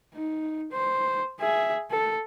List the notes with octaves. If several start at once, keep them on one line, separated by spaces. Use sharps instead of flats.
D#4
C5
G#4 E5
A4